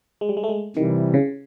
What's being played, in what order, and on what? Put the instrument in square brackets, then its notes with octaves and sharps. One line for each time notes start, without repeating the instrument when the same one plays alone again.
[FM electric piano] G#3
G3
G#3
A3
G#3
[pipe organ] C3 E3 G3 [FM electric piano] D#3
[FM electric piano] C#3